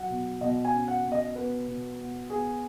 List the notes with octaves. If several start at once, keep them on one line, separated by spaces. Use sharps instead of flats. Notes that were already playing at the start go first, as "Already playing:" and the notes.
Already playing: F#3 F#5
B2
B2 D#5
G#5
C#4
F#5
B2
D#5
B3 B4
B2
B3
B3 G#4